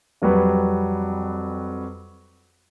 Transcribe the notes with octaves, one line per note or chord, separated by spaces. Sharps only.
F2 F#3 G3 B4